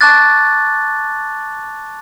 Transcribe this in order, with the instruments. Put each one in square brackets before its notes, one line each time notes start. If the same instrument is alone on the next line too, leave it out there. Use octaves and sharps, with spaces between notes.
[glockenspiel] A5 C#6 D6 F#6 A6